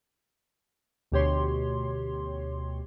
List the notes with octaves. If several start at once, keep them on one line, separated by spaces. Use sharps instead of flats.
D2 B2 G4 C#5 C6